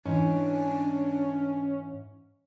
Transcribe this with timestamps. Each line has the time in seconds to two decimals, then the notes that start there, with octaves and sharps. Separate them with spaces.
0.05 G#2 E3 C#4 D4